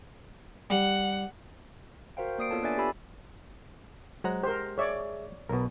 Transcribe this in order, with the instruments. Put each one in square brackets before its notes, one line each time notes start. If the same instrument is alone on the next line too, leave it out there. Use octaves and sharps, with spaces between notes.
[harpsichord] G3 [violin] F#5
[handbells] F#4 A#4 C5 F5 G5
A#3 D5 D#6 C7 D7
B3 F4 A4 C#5 A5
D4 B4 D5 E5 G#5 A6
G4 A4 E5 G#5 B5 E6
[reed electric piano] F#3 C5 A#5 [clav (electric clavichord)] G#3 F#5
[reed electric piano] G4 [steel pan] A#4 C5
[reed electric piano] G#4 E5 [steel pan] C#5 D5
[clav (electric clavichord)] B1 B2 [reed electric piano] B3 A#4